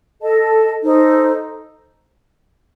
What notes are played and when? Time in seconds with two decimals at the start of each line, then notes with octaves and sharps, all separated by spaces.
0.22 A4 D#5 A5
0.83 D#4 A4 C5